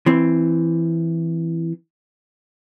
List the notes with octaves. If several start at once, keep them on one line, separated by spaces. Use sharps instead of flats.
E3 C4